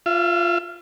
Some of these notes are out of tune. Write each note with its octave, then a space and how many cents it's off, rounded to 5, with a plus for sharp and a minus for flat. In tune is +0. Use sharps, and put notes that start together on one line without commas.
F4 +0 E5 +40